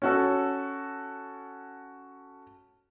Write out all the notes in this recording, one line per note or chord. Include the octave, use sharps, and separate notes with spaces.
C#4 F#4 A4